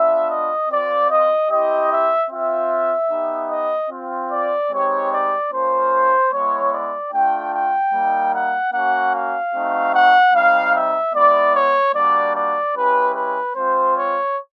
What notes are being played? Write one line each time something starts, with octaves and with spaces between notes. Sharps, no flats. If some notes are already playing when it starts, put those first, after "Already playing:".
Already playing: B3 D4 F4 E5
D#5
C4 F4 D5
D#5
C4 E4 G4 D#5
E5
C4 F4 E5
B3 D#4 G4
D#5
C4 F4
D5
G#3 C4 D#4 G4 C#5
D5
A#3 C#4 F4 C5
G#3 B3 E4 C#5
D5
A3 D4 F4 G5
G5
G3 A#3 D#4
F#5
A#3 C#4 F#4 F#5
F5
A3 C4 D#4 F#4
F#5
G3 C4 D#4 F5
E5
G#3 B3 E4 D5
C#5
G3 A#3 D4 F#4 D5
D5
G#3 C#4 E4 G4 B4
B4
G#3 C4 F4 C5
C#5